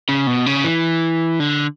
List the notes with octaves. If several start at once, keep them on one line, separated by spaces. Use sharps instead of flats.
C#3
B2
C#3
E3
D3